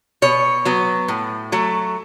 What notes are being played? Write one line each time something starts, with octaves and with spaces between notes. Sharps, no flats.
B2 C#5
F#3 B3
A2
F#3 A3